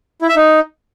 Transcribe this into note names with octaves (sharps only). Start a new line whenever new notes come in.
E4
E5
D#4